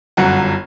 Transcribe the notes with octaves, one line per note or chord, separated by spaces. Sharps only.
G1 F#2 F#3 F#5